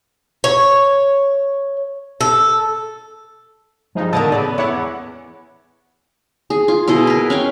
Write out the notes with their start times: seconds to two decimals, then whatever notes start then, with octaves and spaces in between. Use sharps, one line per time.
0.44 C#5
2.21 A4
3.95 G2 F3 G#3 D#4
4.13 D3 D#3 A3 B3 A4 A#5 D#6 A6
4.32 C#3 B3 A4 D5
4.58 B3 E4 C#5 F#5 D6
4.71 E2
6.50 G#4
6.68 F4
6.88 B2 E4 G#4 D#5
7.07 A#4 B4
7.30 C#4 F5 G5